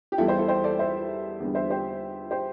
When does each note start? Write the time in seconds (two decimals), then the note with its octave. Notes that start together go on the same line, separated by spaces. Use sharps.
0.12 G4
0.18 E2 E3 G3 E4 A4
0.28 G4 C5
0.38 E4 A4
0.48 G4 C5
0.64 A4 D5
0.79 C5 E5
1.40 E2 D3 G3
1.55 C5 E5
1.70 G4 C5
2.31 G4 C5